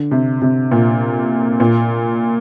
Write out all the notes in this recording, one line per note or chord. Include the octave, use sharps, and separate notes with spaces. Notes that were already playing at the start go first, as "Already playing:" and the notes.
Already playing: D3
C3
C3
A#2
A#2